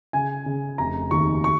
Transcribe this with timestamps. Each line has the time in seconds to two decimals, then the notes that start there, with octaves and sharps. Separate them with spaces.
0.13 C#3 G#5
0.46 C#3
0.78 F1 A#5
1.11 D#2 C#6
1.44 C#6